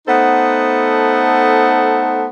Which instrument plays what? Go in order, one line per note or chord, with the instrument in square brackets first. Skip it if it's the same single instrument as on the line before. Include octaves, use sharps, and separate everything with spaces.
[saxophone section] A3 B3 D#4 A4 C5 F#5